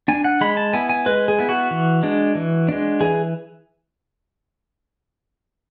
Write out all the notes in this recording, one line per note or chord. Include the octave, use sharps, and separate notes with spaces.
D4 G#5
F#5
G#3 B5
A5
B3 E4 G#5
G#5
G#3 B4
G#4
B3 E4
F#4
E3
G#3 D4
E3
G#3 D4
E3 G#4